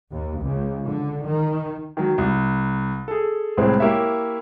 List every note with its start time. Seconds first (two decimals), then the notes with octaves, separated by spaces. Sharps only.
0.12 D#2
0.40 C#2
0.86 D3
1.24 D#3
1.97 D#3 F#3
2.18 C2
3.08 G#4 A4
3.57 C2 A2 G#3 C4
3.80 A#3 E4 G4 A#4 C#5 E5